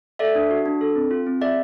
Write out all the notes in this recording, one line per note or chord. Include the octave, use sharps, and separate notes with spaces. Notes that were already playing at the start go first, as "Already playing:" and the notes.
A4 D5 E5
D4
F#4
D4
A4
C4
F4
C4
G#4 D5 E5